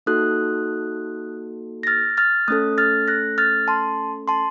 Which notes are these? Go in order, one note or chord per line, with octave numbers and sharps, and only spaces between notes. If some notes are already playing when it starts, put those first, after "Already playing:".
A#3 D#4 F#4 A4 D#6 F#6
A#6
F6 A6
F6 A6
A3 C#4 A4 D#6 F#6
F6 A6
F#6 A#6
F6 A6
A5 C6
A5 C6